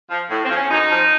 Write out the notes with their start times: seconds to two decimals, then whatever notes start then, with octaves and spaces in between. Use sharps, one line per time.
0.10 F3
0.29 A2
0.44 C4
0.50 F3
0.56 C#4
0.70 F#2 D#4
0.90 F3